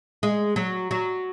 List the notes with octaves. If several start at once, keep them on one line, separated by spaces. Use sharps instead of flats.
G#3
F#3
F#3